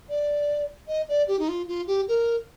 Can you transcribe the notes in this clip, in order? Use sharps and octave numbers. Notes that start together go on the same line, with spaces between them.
D5
D#5
D5
G4
D#4
F4
F4
G4
A#4